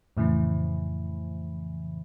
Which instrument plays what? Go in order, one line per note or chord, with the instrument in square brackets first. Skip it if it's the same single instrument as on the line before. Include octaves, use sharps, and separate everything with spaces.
[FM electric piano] F2 A2 C#3 E3